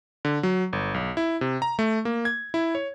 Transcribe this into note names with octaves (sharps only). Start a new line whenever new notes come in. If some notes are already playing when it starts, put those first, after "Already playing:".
D3
F#3
G1
B1
E4
C3
A#5
A3
A#3
G#6
E4
C#5